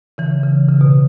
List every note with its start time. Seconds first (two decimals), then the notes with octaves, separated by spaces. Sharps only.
0.18 C#3 E3
0.44 C#3
0.69 C#3
0.81 B2